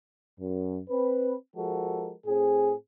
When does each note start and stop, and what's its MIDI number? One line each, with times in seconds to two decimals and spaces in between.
0.39 0.79 42
0.89 1.34 60
0.89 1.34 71
1.56 2.13 53
1.56 2.13 56
1.56 2.13 66
1.56 2.13 69
1.56 2.13 70
2.26 2.73 45
2.26 2.73 60
2.26 2.73 68